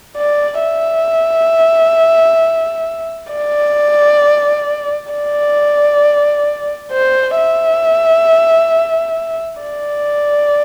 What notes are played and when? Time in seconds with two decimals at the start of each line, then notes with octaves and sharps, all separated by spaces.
0.17 D5
0.63 E5
3.32 D5
5.11 D5
6.91 C5
7.37 E5
9.61 D5